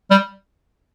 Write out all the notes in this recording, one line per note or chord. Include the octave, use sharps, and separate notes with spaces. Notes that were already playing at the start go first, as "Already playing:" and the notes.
G3